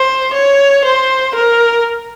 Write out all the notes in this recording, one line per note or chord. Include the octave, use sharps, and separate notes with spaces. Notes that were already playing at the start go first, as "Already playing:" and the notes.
Already playing: C5
C#5
C5
A#4